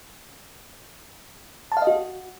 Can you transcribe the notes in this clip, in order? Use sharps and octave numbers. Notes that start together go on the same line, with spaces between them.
A5
F5
D#5
F#4